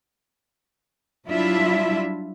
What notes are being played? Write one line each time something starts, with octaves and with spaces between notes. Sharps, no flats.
F#3 G3 D4 E4 F4 E5